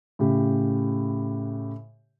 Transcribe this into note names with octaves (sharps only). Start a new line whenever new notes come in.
A2 C#3 G4